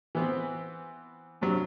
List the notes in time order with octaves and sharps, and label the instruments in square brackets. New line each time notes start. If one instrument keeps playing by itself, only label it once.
[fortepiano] E3 B3 C4
G2 C3 F#3